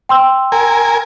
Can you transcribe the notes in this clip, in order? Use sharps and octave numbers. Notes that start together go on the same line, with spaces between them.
G5 C6 E6
A#4 G#5